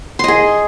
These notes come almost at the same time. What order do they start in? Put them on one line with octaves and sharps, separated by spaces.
C6 D#5 G#4